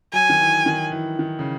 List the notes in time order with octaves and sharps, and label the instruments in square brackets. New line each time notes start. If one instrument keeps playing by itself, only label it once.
[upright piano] F#3 [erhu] G#5
[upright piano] D#3
E3
D#3
E3
D#3
C#3